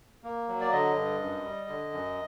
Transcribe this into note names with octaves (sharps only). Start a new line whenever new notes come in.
A#3
F#3
D5
D3 D#5
G2
F#2
G3
D3
F#2